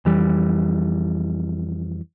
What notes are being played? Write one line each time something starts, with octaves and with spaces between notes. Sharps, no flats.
F2 E3 G3